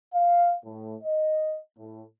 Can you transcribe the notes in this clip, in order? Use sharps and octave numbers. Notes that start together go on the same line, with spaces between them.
F5
A2
D#5
A2